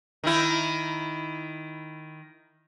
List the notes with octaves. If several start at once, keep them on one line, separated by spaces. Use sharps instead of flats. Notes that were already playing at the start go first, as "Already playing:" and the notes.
D#3 E4